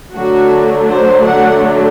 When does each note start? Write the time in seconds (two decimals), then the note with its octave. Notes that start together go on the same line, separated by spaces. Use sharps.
0.15 D3 F#3 A3 D4 F#4
0.89 C5
1.26 F#5